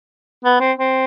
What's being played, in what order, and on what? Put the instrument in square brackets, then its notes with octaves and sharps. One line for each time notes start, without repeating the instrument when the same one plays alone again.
[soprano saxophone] B3
C4
C4